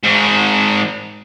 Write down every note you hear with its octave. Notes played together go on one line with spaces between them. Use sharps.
G#2 D#3